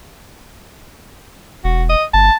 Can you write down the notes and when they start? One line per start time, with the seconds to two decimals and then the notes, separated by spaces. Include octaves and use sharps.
1.64 E1 F#4
1.89 D#5
2.13 G1 A5